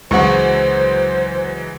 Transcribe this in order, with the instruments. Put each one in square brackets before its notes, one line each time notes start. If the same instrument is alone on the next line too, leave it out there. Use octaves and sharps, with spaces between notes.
[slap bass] C#2 D3 [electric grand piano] E3 F#3 G#3 [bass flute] C5 [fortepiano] F#5 C#6